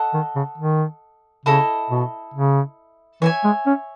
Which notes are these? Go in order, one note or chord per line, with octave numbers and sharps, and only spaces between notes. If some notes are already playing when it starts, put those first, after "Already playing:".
Already playing: A4 D#5 F#5
D#3
C#3
D#3
C#3 E4 A4 D#5
B2
C#3
E3 C#5 E5 G#5
G#3
C#4